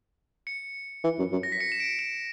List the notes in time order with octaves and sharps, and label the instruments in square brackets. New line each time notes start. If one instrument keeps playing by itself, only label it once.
[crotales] C#7
[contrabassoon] E3
F#2
F#2
[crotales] A#6
B6
C#7
E7
D7
E7